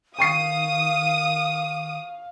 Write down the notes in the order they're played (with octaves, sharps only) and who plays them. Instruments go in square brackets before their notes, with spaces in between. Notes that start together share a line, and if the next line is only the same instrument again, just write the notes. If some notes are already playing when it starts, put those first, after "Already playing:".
[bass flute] D#3 [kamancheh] F5 [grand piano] G5 C#6 C7 [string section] D#6